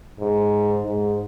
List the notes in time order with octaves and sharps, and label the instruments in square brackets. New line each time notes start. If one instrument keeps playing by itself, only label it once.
[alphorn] G#2
G#2